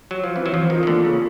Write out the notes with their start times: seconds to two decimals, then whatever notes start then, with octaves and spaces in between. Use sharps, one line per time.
0.11 F#3
0.24 F3
0.36 E3 C4
0.46 F#3
0.53 E3 F3
0.70 D#3 F4
0.83 D#3
0.87 D3 A#3
1.05 C#3 A#3